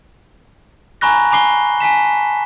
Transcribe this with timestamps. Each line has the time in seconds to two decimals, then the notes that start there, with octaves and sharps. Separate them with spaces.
1.01 G#5 A#5 B5 C#6 F#6 A#6
1.31 G#5 B5 D6 C7 G7
1.80 G#5 A5 B6 E7